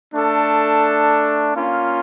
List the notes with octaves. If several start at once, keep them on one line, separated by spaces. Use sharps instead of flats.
A3 D4 A4
A#3 C#4 F4